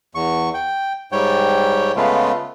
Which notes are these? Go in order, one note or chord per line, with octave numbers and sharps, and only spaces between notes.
E2 C#6
G5
G#2 G3 C#5 G5
C#3 G#3 A3 B3 F4